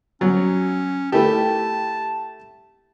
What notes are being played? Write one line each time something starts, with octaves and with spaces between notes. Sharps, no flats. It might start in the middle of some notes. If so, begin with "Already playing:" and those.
F#3 C#4
A3 E4 G4 A5